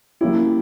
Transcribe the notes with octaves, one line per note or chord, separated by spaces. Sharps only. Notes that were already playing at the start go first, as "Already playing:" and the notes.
F#3 A#3 C#4 E4 G4